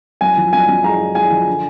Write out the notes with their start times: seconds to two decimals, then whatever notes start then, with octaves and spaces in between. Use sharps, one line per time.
0.21 F#2 G#5
0.37 F3
0.53 F#2 G#5
0.68 F#2
0.84 G#3 A#5
0.99 G#3
1.15 G#3 G#5
1.31 F3
1.47 D3